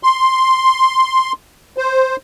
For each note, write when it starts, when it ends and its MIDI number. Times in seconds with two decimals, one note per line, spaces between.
0.03 1.32 84
1.77 2.16 72